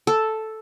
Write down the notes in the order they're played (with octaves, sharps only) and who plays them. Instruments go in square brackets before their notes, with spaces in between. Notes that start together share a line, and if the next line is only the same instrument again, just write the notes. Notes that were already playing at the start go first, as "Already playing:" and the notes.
[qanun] A4